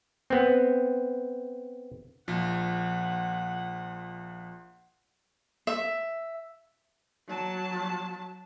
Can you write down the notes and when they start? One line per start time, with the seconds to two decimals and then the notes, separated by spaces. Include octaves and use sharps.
0.30 B3 C4
2.28 A#1 F3 F#5
5.67 E5
7.29 F#3 A5